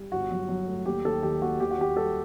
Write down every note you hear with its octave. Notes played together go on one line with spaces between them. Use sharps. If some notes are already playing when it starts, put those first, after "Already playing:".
Already playing: G3
G1 F#4
F#3
F#3
A3
D#2 G4
D#2 A4
D#3 G4
D#2 F#4
D#2 G4
F#4
D#2 G4
G3 A4